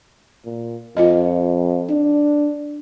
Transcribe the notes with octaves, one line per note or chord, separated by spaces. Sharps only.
A#2
F2 F4 D#5
D4